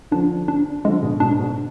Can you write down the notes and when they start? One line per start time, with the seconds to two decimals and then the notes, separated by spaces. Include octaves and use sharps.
0.11 D3 F3 D4
0.48 D4
0.85 D3 F3 G#3
1.03 B2 D3
1.20 G#2 B2 D4
1.39 G#2 B2